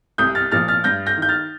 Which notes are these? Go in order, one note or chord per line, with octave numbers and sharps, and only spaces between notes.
C2 D#6 G6
F6 A6
A#2 F3 F6 A6
F6 A6
G2 G6 A#6
G6 A#6
D#3 G6
F6 A6